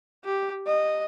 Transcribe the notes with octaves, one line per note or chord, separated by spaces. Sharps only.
G4
D#5